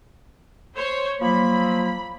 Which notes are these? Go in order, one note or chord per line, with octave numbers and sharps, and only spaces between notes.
C5 C#5
F3 F#3 A#3 B5